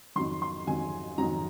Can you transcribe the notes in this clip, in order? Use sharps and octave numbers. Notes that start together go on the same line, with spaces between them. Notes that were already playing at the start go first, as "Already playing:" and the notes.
F2 D#3 F#3 C6
C6
F2 D#3 F#3 G#5
F2 D#3 F#3 A#5